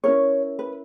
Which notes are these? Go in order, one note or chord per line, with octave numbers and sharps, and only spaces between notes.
C#4 E4 A#4 C#5
B4